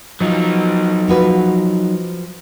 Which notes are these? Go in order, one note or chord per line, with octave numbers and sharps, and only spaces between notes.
F3 F#3 D#4
F3 F#4 B4